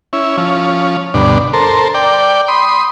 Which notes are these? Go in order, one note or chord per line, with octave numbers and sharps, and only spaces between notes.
C#4 E4
F3 C#4
D2 G2 B2 D4
A4 A#4 C5
D5 G5
B5 C6 D#6